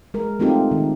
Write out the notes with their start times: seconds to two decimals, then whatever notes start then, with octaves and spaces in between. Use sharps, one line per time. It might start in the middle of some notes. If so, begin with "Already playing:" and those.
0.14 G#3 A#4
0.40 A3 C4 D#4 F4 G4 A4
0.71 D#3